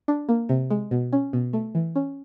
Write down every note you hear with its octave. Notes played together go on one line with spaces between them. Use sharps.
D4
A#3
C3
G#3
B2
C#4
B2
A3
E3
C#4